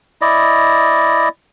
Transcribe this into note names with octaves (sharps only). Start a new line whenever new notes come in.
E4 D5 D#5